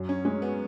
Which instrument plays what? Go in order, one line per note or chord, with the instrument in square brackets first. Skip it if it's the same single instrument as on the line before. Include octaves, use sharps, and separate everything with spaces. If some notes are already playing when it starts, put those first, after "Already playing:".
Already playing: [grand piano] F#2
[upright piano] C#4
[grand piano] G#3 [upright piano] C#4
[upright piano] B3